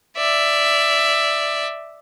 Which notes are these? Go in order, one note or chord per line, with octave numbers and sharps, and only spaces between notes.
D5 E5